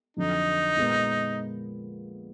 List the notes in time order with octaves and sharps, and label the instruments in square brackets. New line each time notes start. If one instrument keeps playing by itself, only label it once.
[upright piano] F2 D3 F#3 [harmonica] D#4
[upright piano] A#2 G#3 B3